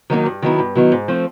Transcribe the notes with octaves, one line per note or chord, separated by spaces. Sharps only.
D#3 F#3 A#3 D#4
G2
D#3 F#3 B3 E4
G2
D#3 F#3 B3 E4
G#2
F3 A3 C4